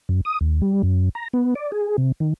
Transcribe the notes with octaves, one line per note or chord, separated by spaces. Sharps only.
F#2
D#6
D#2
G3
F#2
A#5
B3
D5
G#4
C3
D#3